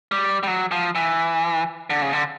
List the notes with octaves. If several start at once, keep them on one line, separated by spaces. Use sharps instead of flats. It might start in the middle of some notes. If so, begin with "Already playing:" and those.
G3
G3
F#3
F3
E3
D3
C#3
D3